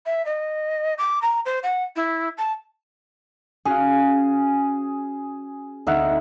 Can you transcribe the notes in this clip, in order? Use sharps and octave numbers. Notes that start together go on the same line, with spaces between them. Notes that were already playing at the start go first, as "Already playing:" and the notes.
E5
D#5
D6
A#5
C5
F#5
E4
A5
C#4 F#4 G#4 F5
D2 C4 D#4 E5 F#5 F6